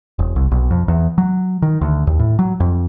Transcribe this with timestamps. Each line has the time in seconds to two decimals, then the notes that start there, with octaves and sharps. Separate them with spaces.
0.19 E1
0.36 C2
0.51 B1
0.71 F2
0.88 E2
1.18 F#3
1.62 D#3
1.81 D2
2.07 D#2
2.19 A2
2.39 F#3
2.60 F2